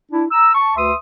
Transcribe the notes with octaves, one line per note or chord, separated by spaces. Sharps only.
D4 E4
A#5 E6
A5 C#6
D2 B4 E5 C6 D#6